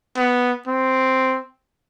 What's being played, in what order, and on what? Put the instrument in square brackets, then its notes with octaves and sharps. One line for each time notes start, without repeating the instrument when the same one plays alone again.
[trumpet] B3
C4